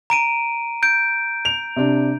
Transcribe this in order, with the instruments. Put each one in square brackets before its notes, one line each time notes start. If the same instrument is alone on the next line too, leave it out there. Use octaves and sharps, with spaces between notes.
[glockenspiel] A#5 D7 D#7
G6 D7
[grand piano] F7
C3 D4